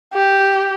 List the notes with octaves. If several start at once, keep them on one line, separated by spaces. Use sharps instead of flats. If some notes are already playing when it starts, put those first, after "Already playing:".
G4